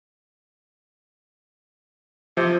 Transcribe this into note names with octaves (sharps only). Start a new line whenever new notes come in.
C3 F3